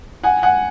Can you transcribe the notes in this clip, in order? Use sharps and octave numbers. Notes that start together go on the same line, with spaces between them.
F#5 G#5
F#5 G#5